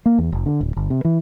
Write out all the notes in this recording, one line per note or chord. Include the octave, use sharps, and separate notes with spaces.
A#3
E2
F1
D3
D1
G1
C3
E3